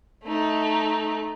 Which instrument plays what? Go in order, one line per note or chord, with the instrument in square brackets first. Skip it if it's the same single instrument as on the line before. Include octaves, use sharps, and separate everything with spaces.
[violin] A3 D#4